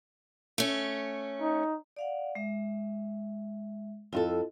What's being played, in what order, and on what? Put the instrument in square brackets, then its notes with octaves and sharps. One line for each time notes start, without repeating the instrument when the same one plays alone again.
[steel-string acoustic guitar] A3 C#4
[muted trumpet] D#4
[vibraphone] D5 F5 F#5
G#3 E5
[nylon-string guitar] F2 F4 A4 [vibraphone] E4 D#5